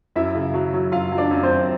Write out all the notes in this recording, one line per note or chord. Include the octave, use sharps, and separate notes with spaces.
F#2 E4 E5
C#3
F#3
F#3
F#2 F4 F5
F#3
D4 D5
F#2
C4 C5
F#2